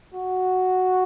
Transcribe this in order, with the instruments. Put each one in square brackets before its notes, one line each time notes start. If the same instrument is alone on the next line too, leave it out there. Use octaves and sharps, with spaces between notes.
[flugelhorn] F#4